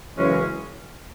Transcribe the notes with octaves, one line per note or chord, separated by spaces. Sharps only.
F#2 C#3 E3 G#3 C#4